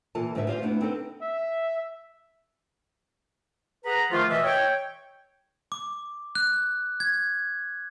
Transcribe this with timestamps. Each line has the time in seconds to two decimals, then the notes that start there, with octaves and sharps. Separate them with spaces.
0.15 A#2 E3 F4 A4 A5
0.35 G#2 D3 D#3 B4 E5
0.47 F4 G4 C5 D#5 F5
0.62 A3 B3 D4 E4
0.81 C4 D4 D#4 A4 B4
1.21 E5
3.85 G#4 B4 F#5 A#5
4.11 D#3 F3 A3 D4 F4
4.30 B2 E3 D#5 E5
4.44 C#5 G5
5.72 D6
6.35 F#6
7.00 G#6